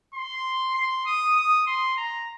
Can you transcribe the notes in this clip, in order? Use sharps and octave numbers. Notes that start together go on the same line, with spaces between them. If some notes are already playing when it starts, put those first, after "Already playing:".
C6
C6
D#6
D#6
C6
A#5